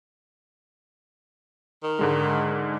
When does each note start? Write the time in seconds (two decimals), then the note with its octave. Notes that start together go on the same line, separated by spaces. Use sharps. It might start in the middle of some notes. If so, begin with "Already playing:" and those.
1.84 D#3
1.99 G#2 D3 G#3